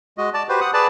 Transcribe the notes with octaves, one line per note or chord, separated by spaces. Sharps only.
G#3 F#4 D#5
D5 A5
F#4 G4 B4 C5
F#5 D#6
G#4 B4 D5 A5